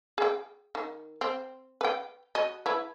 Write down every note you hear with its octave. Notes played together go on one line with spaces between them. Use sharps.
G#4 G5
D#3
C4
B4 G5
F#4 D#5
E4 B4